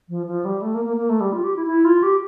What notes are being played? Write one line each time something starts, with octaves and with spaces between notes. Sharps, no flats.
F3
F3
G3
A3
A#3
A#3
A#3
A3
G3
F4
G4
E4
E4
F4
G4